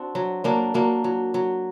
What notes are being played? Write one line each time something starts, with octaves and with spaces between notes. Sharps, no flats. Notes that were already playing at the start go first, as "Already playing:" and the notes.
Already playing: C4 D4 F#4
F#3
F#3 A#3 D4
F#3 A#3 D4
F#3
F#3